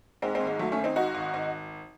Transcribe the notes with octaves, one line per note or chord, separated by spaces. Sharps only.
G#2 G#3 C4
G#3 C4
G#1
G#3
F#3 A3
A3 C#4
G#1
C4 D#4
G#2 D#4 F#4
G#1
G#1